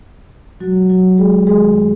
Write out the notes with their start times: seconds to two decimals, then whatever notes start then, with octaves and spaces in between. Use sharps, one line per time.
0.60 B2 F#3 G#3 F#4
0.90 F#3 F#4
1.18 G#3 G#4
1.47 F#2 D#3 F#3 G#3 A3 G#4